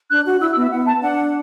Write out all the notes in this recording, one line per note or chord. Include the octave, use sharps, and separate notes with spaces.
D4 F#6
F#4
E4 E6
E6
B3
E5
B3 F#5
A5
D4 F#5